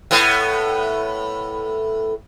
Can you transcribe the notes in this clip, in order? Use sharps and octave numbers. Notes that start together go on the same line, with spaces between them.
A2 B3